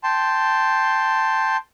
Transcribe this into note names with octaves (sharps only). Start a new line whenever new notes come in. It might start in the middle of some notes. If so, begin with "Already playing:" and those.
G5 A5 C6